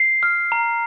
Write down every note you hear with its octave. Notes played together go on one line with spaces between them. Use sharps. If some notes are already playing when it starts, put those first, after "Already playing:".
Already playing: C7
F6
A#5